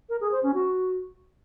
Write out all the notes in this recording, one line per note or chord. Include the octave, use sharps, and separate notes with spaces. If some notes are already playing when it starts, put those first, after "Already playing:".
A#4
G#4
C5
C#4
F#4